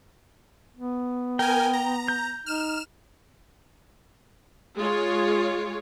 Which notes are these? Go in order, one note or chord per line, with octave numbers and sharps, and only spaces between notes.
B3
A#4 G5 G#5
A#5
G6
D#4 F6 E7
G#3 F4 C#5